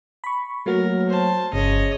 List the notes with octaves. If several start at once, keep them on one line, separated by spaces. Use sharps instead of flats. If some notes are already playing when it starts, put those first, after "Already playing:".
B5 C#6
F#3 A3 A#3 F#4 A#4
C5 A5
G1 C#3 C#5 D#5